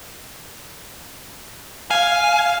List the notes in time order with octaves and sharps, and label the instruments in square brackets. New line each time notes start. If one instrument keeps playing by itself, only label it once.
[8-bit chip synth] F5 [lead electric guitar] G#5